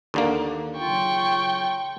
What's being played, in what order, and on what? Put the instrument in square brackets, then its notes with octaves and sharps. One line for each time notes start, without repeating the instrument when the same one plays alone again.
[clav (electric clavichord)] D#2 D3 A#3
[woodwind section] C#3 F#3 F4 [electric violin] G5 C#6